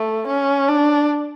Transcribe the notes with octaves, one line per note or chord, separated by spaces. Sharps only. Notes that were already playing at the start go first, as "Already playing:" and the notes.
Already playing: A3
C#4
D4